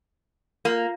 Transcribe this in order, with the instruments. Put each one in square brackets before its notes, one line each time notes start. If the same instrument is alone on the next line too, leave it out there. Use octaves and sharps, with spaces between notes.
[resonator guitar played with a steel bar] A#3 [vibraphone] F4 F5